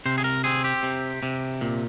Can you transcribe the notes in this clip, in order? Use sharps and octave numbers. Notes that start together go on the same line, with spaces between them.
C3 C5
G#4
A#4
C4 G#4
G4
C3
C3
A#2